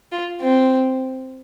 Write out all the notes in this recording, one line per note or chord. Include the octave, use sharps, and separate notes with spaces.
F4
C4